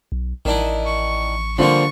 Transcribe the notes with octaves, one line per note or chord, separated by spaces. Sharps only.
B1
A1 D#3 D4 E4
C#6
D3 F3 G3 A#3 F4 C#6